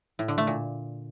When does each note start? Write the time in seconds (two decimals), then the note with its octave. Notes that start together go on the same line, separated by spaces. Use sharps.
0.19 A2
0.28 D3
0.38 A3
0.47 A#2